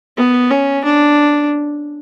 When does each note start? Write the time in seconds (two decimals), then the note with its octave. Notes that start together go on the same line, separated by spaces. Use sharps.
0.17 B3
0.51 C#4
0.85 D4